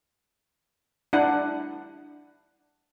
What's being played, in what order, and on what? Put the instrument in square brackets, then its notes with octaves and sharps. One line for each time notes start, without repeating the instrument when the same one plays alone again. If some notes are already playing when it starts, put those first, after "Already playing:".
[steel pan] D4 E4 F#5